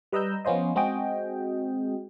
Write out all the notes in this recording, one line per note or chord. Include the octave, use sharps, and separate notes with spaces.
G3 B4 D#5 A#5 E6 G6
F3 B3 C#4 F4 C5 D#5
G#3 C4 F#4 G#4 D#5 G5